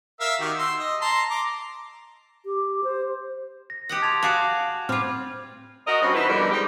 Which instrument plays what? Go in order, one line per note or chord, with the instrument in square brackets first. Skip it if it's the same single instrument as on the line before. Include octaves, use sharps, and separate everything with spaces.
[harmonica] A#4 E5 F5
D#3 F#4 G4
C6 E6
D#5
A5 A#5 C6
A#5 D6
[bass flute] G4
C5
[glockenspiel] A#6
[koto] G4 D#5 F#5
[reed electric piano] A5 C6 [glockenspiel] G#6 A6 F7
[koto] F#4 G#4 D5 [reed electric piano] F5 A5
[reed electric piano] A2 C4 C5 [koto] G3 F4 [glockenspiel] F6
[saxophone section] F#4 A#4 D#5
G2 C4 C#4 F#4
E3 D#4 E4 B4 C5
B2 D3 D#3 F3 G3
G#3 D#4 G4